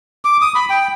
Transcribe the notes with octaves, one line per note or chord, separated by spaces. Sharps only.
D6
D#6
B5
G5